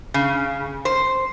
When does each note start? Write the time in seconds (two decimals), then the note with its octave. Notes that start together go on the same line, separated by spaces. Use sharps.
0.14 C#3
0.85 C5